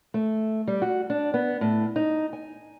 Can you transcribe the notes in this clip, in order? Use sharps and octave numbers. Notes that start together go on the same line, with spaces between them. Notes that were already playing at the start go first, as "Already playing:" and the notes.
A3
G3
F#4
D4
B3
A2
D#4
G#5